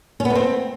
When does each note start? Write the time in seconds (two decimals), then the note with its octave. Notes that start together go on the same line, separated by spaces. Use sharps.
0.20 C#4
0.25 B3
0.30 A3
0.35 C4